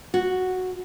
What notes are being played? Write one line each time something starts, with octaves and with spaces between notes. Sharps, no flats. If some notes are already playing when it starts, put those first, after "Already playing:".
F#4